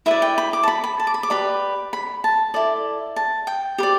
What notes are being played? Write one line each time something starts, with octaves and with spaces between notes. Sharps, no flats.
E4 B4 D5 E5
G5
B5
D6
A5
B5
B5
A5
D6
B5
D6
G4 B4 D5 B5
B5
A5
E4 A4 D5
A5
G5
G4 B4 D5